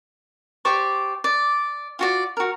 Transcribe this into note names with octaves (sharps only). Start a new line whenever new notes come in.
G4 C5 D5 C#6
D5
F4 F#4 D5
F#4 A#4